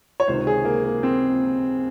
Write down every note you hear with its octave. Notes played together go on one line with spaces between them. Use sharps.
C#5
C#2 C3 D#3 C5
G#4
A#3
A#3
C4